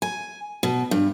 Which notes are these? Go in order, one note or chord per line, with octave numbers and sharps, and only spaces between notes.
G#5
B2
G2